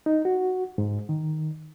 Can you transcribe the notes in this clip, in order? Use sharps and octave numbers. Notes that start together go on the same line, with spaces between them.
D#4
F#4
G#2
D#3